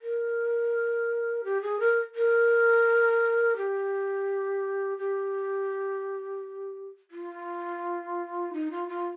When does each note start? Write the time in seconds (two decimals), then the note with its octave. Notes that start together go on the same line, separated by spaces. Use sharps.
0.02 A#4
1.44 G4
1.62 G#4
1.80 A#4
2.15 A#4
3.57 G4
4.98 G4
7.11 F4
8.53 D#4
8.71 F4
8.88 F4